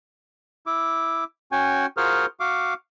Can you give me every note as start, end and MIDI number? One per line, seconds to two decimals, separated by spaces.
0.66 1.24 64
0.66 1.24 86
1.52 1.86 61
1.52 1.86 66
1.52 1.86 79
1.52 1.86 80
1.97 2.26 65
1.97 2.26 66
1.97 2.26 68
1.97 2.26 70
1.97 2.26 72
1.97 2.26 89
2.40 2.74 66
2.40 2.74 77
2.40 2.74 86